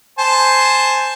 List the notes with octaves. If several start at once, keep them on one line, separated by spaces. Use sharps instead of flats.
C5 G#5 A5